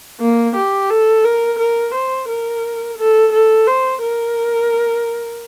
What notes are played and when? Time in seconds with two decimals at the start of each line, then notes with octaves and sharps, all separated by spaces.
0.21 A#3
0.56 G4
0.90 A4
1.25 A#4
1.59 A#4
1.94 C5
2.29 A#4
2.98 A4
3.33 A4
3.67 C5
4.02 A#4